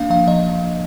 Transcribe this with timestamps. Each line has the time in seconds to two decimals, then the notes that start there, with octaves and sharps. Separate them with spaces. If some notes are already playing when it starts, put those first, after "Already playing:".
Already playing: A#3 D4 F5
0.10 F3 F5
0.27 F3 D#5